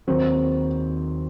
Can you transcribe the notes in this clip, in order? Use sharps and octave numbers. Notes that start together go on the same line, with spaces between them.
D#2 D#3 F#3 C4